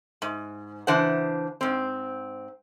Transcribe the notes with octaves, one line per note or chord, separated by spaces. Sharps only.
G#2
C#3 E3 D4 C5 F#5
G#2 C4